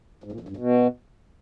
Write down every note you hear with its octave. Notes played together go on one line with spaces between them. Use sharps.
G#2
A#2
F2
G2
B2